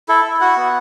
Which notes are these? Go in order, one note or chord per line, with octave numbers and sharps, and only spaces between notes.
E4 A4
E4
F#4 F#5
B3